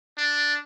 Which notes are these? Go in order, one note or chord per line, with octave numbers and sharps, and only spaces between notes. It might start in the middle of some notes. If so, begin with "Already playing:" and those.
D4